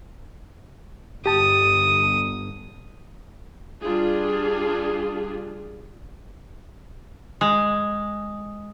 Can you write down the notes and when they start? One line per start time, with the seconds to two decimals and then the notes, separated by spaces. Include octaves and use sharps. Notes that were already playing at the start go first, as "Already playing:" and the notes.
1.26 G1 G4 A5 D#6
3.82 G3 D4 F4 G#4
7.41 G#3